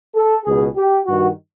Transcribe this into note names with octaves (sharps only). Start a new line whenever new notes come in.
A4
C#2 B2 G#4
G4
G2 D#3 F#4